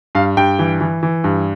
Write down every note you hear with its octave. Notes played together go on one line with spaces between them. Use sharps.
G2 F5
G2 G5
E3
E3
E3
G2